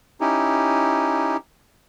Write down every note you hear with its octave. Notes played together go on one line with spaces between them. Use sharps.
C#4 D#4 E4 G4